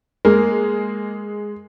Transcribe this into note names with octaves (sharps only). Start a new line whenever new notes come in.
G#3 A#3